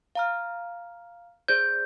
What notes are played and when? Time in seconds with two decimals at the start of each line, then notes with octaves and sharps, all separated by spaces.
0.15 F5 A#5 F6
1.48 G#4 C5 D5 G6